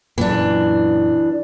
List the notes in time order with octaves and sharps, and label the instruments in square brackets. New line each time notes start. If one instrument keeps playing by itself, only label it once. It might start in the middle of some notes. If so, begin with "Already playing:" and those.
[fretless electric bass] F#2 A#2 [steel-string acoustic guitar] E3 D4